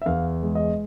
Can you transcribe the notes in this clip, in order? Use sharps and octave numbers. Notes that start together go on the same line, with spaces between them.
E5
E2 F5
G#3
D#5